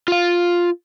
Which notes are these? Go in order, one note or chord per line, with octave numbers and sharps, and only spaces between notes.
F4 F5